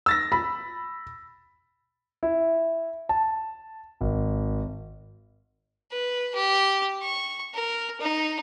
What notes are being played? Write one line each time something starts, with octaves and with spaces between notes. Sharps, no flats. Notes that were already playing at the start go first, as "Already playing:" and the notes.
E6 A6 A#6
B5
E4
A5
G#1
B4
G4
C#6
A#4
D#4